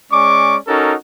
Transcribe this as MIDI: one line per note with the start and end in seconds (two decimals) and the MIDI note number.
0.12 0.58 56
0.12 0.58 61
0.12 0.58 74
0.12 0.58 85
0.12 0.58 86
0.68 0.94 61
0.68 0.94 63
0.68 0.94 66
0.68 0.94 69
0.68 0.94 70